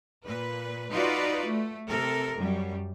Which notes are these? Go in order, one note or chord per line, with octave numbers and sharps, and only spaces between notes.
A#2 B4
D#4 F4 F#4 B4 D5
A3
C3 A4 A#4
F#2 G3